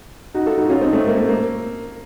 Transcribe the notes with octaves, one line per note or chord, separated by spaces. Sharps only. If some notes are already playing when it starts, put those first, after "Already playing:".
D#4 F#4
F4 A4
D#4 F#4
C#4 F4
C4 D#4
A3 C4
A#3
A3
A#3